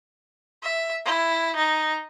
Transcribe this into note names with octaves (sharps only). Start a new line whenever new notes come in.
E5
E4
D#4